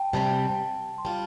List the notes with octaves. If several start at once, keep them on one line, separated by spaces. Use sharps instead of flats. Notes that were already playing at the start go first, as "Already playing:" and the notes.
Already playing: G5 A5
C3 G3 C4 A5
C6
G3 F4 A5